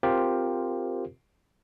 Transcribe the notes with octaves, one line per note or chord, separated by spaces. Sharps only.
C4 F4 G4 A#4 C5